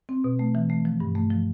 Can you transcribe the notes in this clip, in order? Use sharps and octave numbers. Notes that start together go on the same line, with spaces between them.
C4
B2
A3
E3
A3
F3
G2
A3
F3